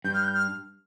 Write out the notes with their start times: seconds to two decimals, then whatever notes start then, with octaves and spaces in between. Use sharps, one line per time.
0.04 G2 G6
0.14 F6
0.24 G6
0.34 F6